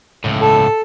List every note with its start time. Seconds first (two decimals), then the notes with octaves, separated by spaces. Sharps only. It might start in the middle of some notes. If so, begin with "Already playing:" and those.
0.24 C#2 A2
0.41 A4 A5